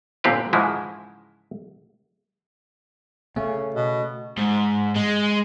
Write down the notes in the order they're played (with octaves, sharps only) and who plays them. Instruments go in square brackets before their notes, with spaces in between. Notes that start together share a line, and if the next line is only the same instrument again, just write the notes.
[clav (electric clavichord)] G1 A#2 D3 C4 G4 B4
G#2 C#3 E3 F3 G#3 E4
[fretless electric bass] C#3 [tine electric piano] A3 [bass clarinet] C#4
[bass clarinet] B2
[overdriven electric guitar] G#2
G#3